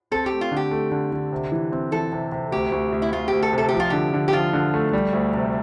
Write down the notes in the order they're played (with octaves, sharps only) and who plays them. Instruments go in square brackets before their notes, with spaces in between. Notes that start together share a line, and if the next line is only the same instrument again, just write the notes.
[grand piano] C4 [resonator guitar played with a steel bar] A4
[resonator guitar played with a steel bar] G4
[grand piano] A3
[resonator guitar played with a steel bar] F4
[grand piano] D3
[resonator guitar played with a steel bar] G4
[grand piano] A3
D3
D3
C3
E3
C4
[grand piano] E3 [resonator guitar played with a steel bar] A4
[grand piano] C3
C3
[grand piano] D2 [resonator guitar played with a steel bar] G4
[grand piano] D2
D2
[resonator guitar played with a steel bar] E4
[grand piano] D2 [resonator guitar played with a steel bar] F4
[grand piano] D2 [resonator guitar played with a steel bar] G4
[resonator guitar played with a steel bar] A4
[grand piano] C3 [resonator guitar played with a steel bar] A4
[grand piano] F3 [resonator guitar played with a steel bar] G4
[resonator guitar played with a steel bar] F4
[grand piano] D3 [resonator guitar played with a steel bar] G4
[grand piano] D3
[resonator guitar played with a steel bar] G4
[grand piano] F3 [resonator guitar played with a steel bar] F4
[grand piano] D3
A3
G3
D2
C3